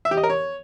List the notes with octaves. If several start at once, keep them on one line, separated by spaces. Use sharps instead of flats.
E5
G4
D#5
A#4
C#5